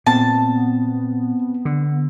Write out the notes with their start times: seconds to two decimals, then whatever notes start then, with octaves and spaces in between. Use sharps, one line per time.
0.07 A#2 B3 C4 A5
1.65 D3